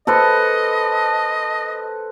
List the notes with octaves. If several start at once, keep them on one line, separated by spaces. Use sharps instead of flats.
A4 B4 C5 D#5